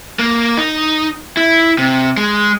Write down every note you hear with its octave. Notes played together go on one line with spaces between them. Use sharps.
A#3
D#4
E4
C3
G#3